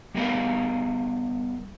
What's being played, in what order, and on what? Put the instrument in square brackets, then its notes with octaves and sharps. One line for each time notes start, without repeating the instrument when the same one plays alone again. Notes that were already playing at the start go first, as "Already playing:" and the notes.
[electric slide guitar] G3 B3 A#4 C5 D#5 F5